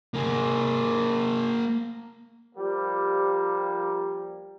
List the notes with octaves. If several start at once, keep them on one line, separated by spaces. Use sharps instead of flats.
A#3 G#4
F3 G3 A#3 G4